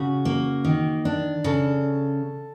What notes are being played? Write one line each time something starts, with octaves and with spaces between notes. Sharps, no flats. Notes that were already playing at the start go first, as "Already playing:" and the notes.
Already playing: C#3 F#4
A#3
D#3
D4
C#3 A4